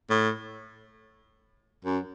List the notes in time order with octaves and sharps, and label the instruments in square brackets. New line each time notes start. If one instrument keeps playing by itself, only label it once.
[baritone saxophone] A2
F#2